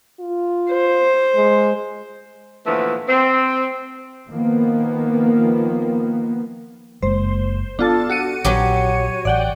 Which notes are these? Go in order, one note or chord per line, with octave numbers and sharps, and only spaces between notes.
F4
C5
G#3
A#2 D3 E3 F3 A3 B3
C4
D#3 F3 A#3 B3
F#1 G#3 A#3 C5
B3 D4 F4 A4 A5
F#4 C#7 D#7
A#1 F#3 G4 C#5
A1 D5 F#5 G5